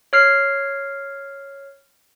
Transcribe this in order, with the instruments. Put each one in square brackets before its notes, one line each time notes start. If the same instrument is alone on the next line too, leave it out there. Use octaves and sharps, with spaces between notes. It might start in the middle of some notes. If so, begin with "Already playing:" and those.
[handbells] C#5 F6 C7